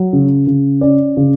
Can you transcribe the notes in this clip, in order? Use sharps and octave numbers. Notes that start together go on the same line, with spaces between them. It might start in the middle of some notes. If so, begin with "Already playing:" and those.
Already playing: F#3
C#3
C#3
C#4 D5
C#3